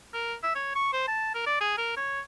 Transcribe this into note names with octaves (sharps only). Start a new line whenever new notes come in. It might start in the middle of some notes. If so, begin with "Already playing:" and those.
A#4
E5
C#5
C#6
C5
A5
A#4
D5
G#4
A#4
C#5